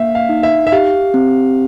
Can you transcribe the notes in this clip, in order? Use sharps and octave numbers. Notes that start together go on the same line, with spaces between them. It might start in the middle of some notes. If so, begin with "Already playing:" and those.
Already playing: A#3 E5 F5
F5
D#4
E5
E5
G4 F5
C4